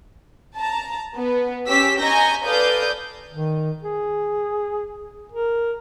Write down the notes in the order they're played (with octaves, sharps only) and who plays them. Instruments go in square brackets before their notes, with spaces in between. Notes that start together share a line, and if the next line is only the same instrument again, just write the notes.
[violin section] A5 A#5
B3
C#4 G4 E6 B6
D#5 G#5 A#5 C#6 G6 A#6
A4 B4 D5 F5 D#6 G6
[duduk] D#3
G#4
A#4